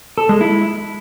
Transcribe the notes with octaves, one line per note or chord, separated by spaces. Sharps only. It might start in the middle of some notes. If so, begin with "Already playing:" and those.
A4
G#3
E4